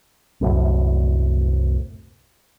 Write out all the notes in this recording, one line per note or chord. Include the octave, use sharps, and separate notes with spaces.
C2 F#2 A2